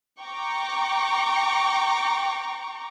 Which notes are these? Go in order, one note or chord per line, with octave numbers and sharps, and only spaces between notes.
G5 A#5 C#6 D6